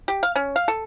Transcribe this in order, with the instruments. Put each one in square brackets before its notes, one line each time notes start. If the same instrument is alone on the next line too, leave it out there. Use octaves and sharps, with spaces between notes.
[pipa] G4
F5
C#4
F5
A4